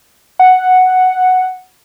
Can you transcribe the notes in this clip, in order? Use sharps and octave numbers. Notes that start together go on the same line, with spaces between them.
F#5